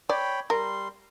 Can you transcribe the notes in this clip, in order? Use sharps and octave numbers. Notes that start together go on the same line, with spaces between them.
C#5 D5 G5 B5
G3 A#4 C6